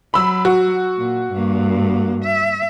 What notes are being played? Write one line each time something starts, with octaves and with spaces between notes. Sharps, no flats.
F#3 B5 E6
F#4
A#2
G2 A#3
E5